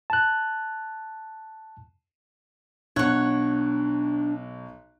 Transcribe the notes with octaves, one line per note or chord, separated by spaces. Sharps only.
A5 F#6
B1 D4 C#5 F#5 F#6